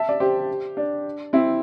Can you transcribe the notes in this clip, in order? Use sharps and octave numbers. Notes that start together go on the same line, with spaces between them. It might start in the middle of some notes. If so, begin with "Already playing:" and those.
Already playing: E5 A5
D5
G4 C5
D4
C4 E4